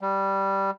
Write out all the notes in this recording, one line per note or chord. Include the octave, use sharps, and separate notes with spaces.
G3